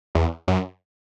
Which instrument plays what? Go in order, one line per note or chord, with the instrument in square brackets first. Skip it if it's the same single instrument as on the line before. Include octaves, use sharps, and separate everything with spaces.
[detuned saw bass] E2
F#2